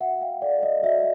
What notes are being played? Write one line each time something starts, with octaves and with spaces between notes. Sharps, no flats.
F#4 E5 F#5
F5 G5
A4 D5
D#5
F#4 D5 E5